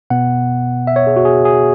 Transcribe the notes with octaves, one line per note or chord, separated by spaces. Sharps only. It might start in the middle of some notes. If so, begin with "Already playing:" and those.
B2 B3 F#5
E5
C#5
G#4
F#4
G#4
G#4